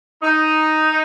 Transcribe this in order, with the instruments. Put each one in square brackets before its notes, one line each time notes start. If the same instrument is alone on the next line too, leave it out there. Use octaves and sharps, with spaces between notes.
[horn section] D#4